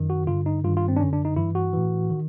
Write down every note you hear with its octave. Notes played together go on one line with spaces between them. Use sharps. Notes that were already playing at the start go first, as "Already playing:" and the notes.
Already playing: F#2 D#3
F#4
G2 D3 F4
D#4
G2 D#3 F4
F4
C4
D4
F#2 D3 C#4
D4
D#4
G2 E3 E4
F#4
A2 E3
D#3